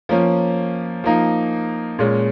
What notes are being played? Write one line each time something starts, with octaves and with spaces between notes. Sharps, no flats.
F3 A#3 C#4
F3 A#3 D#4
A#2 G#3 C#4